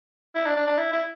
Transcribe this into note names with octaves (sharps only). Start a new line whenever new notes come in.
E4
D4
D4
D4
E4
E4